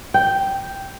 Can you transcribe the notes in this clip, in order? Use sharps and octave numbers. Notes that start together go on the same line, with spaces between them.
G5